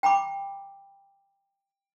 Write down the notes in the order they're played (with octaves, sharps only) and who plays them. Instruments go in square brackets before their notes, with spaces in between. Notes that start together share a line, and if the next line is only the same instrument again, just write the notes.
[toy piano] G5 A#5 B5 D6